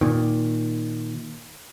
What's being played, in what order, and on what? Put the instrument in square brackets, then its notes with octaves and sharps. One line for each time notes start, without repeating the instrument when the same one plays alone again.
[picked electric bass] A#2 D#3